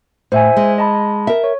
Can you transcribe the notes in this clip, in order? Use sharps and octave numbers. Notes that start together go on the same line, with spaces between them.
A2 C5 E5 G#5
G#3
D#5 A5 B5
A#4 E5
C#5